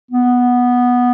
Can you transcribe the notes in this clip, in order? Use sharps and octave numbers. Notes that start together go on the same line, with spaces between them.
B3